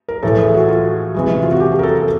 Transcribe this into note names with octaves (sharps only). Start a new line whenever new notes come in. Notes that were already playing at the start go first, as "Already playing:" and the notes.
A#4
A2 E3 A3 A4
G#4
F#4
F4
C3 E3 G#3
F4
F#4
G4
G#4
A#4
A4
A4